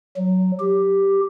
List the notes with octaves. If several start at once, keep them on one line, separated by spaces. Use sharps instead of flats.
F#3
G4